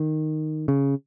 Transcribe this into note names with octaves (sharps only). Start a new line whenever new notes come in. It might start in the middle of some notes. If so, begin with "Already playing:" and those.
Already playing: D#3
C#3